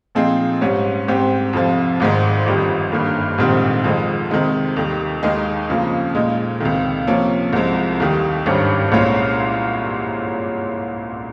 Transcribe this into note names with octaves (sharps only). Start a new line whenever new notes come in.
A#2 F3 C4 D#4 G#4
G#2 G3 C#4
G#2 G3 C4 G4
F2 C3 F3
G#1 G#2 D#3 G#3
G1 F2 D#3 G3
G1 G2 D#3 A#3
A#1 G#2 D#3 G3 C4
F2 D#3 G#3
C3 D#3 G#3 D#4
D#2 D#3 G3
D#2 D#3 G#3 D#4 G#4
F2 C#3 F3 A#3
A#2 G#3 D#4
C#2 C3 D#3
C3 F3 A#3 C#4
C2 C3 F3 G#3
D#2 D#3 G3
G#1 G2 D#3 G3 C#4
C2 A#2 G#3 C#4 F4